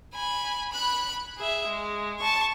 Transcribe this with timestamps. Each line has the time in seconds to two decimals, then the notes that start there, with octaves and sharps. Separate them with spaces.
0.14 G#5 B5
0.72 B5 F#6
1.37 G#4 E5
1.67 G#3
2.20 A5 C#6